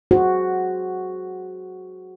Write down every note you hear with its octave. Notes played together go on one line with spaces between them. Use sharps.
F#4 G#4 C5